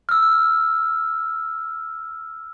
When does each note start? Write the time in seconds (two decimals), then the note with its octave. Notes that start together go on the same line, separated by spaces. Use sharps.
0.09 E6 F6